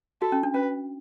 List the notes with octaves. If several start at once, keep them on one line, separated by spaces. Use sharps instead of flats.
F#4 A4
C#4
D4
C#4 B4